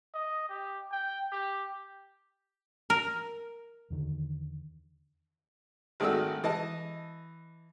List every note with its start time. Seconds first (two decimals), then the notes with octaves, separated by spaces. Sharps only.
0.14 D#5
0.49 G4
0.92 G5
1.32 G4
2.90 A#4
3.90 E2 D3 D#3
6.00 G#1 D#3 A3 D4 F#4 E6
6.44 E3 D#5 A5